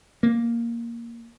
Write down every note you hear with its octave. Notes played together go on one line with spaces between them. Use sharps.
A#3